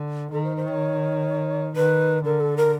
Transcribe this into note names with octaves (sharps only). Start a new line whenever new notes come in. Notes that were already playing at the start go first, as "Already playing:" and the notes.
Already playing: D3
D#3 A4
C5
C5
C#5
D#3 B4
D3 A#4
A4
A#4